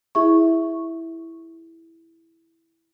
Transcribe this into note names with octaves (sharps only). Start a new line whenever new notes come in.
E4 G#4 E5 C#6